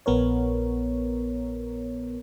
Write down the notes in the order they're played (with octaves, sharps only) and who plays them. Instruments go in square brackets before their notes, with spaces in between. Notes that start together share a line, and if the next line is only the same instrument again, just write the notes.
[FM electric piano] A#1 B3 A#4 C#5